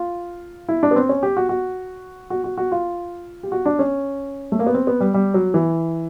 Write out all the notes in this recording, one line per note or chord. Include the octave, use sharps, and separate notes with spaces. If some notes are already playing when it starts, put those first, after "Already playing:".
Already playing: F4
E4
D4
B3
C4
C#4
G4
F#4
F#4
F#4
F#4
F#4
F4
G4
F#4
D4
C#4
A3
A#3
B3
C4
B3
G3
G3
F#3
E3